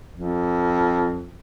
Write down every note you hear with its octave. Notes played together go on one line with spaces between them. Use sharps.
F2